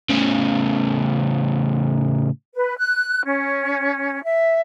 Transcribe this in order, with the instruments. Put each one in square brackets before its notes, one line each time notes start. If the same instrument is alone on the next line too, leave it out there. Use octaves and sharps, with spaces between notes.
[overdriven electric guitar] A2 C#3
[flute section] B4
F#6
C#4
E5